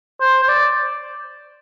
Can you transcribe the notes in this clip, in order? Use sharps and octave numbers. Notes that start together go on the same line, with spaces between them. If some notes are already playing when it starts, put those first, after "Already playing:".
C5
C5
D5